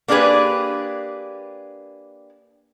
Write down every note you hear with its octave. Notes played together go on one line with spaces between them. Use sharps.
A#3 D4 G4 G#4 B4